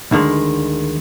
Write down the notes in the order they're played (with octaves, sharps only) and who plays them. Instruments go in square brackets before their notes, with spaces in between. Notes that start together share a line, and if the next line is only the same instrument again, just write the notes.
[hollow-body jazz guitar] D2 D3 D#3 G#3